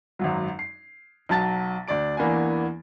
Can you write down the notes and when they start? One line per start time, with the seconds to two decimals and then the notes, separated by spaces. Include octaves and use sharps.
0.19 G#1 F#2 F#3
0.59 C7
1.29 B1 F#3 A5 A6
1.88 D2 D4 D5 D7
2.17 E2 E3 A#3 B3 D4 G#5